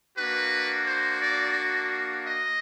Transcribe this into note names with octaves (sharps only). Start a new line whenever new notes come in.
A#3 D4 F#4 B4
C5
D5
D#5